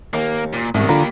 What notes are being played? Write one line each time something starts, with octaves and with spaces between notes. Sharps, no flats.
D#2 A#3
A#2
C2 G#2 B2 D#3
D3 A#3 F4 G4 B4 A#5